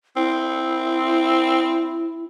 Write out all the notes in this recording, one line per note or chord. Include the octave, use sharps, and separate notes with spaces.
C4 E4